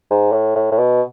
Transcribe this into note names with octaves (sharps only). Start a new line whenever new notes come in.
G#2
A2
A2
A2
B2